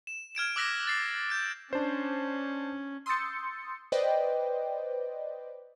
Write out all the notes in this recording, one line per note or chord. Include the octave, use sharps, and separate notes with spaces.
E7
F6 G#6 D7 E7
D6 E6 F#6 A#6 B6
A6 C7
G6 D7
C#4 D4 C5
C6 D#6 E6 G6 A6 C#7
B4 C5 D5 D#5 G5